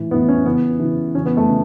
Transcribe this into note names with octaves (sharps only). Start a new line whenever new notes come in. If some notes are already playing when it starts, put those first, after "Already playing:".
Already playing: A2 E3
A2 E3 B3
C#4
C#3 E3 B3
C#3 E3
C#3 E3 C#4
B3
A3
C#3